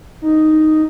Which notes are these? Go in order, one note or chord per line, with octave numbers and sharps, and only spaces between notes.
D#4